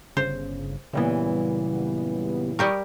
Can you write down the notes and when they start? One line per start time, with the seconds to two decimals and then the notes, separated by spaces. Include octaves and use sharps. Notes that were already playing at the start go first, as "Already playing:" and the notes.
0.17 G1 C#3 C5
0.93 F#2 A#2 C#3 E3 G3 B3
2.59 G3 G4 A#4 C#6 D#6